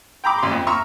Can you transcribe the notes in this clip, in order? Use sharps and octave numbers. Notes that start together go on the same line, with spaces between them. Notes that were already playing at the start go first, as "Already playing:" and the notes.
G5 A#5 B5 D6
A1 C6
F2
E5 A#5 C#6 E6 F6